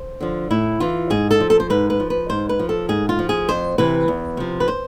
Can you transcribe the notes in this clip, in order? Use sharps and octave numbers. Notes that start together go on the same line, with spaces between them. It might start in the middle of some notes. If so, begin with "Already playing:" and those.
Already playing: C5
D3 F3
A2 E4
E3 F4
G#2 G#4
A4
F3
A4
C5
G#2 B4
B4
F3
B4
G#2 C5
B4
F3
A4
G#2 G#4
F4
F3
G#4
F2 C5
C3 E3 B4
E2
C3 F3
B4
C5